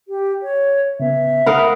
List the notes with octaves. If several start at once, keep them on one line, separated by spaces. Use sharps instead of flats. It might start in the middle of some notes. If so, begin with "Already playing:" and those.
G4
C#5
C#3 B3 E5
A#4 F5 F#5 B5 D#6